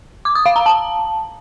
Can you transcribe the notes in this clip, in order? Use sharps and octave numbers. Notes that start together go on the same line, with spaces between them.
D6
D#6
F5
A#5
A5